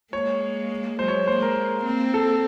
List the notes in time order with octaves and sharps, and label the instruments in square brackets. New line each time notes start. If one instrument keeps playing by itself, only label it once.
[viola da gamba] G#3 A#3 [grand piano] C#5
[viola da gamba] F#3 G#3 [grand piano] C5
[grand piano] C#5
[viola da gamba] G#3 A#3 [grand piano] C5
[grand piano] A#4
[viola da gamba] A#3 C4
[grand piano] A4